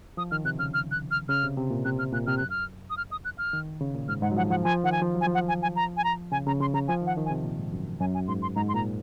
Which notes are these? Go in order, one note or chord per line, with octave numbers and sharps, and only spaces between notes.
F3 D#6
D#3 F6
C3 F#6
C#3 F6
F6
F#6
F6
C#3 F6
C3
C3
A#2
C3 F#6
F6
A#2 F#6
C3 F6
F#2 F#6
F6
D#6
F6
D#6
F#6
F6
D#3
C#3
A#2
G#2 F6
G#2 F#5
F#3
F3 F#5
F3 F#5
F3 G#5
D#3 F#5
G#5
F3
F#3
G#5
F3
F#5
G#5
G#5
A#5
G#5
A#5
C#3 G#5
C#3 A#5
C#3 C6
C#3 A#5
F3 G#5
D#3 F#5
D#3
G#5
C3
A#2
G#2
F#2
F#2 G#5
G#5
G#2 C6
C6
G#2 A#5
C6
A#2 A#5